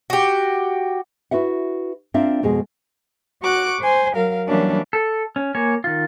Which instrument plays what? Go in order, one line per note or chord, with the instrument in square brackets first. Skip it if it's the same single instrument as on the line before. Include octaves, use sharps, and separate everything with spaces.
[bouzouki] F#4 G4
[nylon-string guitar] E4 F#4 B4 E5 F#5
C4 D4 F4 A#4 E5 F5
F2 B2 G#3 G#4
[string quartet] F#4 C#6 D6 F#6
C5 G#5
F#3 A#4 F5
E3 F#3 G3 A#3 C#4 D4
[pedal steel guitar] A4
C#4
A#3 C#5 G#5
D#3 F4